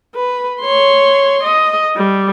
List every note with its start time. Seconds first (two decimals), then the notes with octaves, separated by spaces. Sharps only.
0.15 B4
0.61 C#5 C6
1.44 D#5
1.97 G3